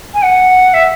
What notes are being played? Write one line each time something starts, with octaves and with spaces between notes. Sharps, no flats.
G#5
F#5
E5